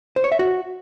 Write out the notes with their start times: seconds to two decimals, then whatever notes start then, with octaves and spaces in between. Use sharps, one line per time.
0.16 C5
0.24 C#5
0.32 E5
0.39 F#4